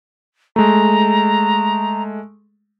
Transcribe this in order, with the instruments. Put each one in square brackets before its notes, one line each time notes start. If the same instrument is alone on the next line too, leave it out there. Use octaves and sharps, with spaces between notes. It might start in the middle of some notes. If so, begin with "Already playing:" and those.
[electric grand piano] G#3 A3 [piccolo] A#5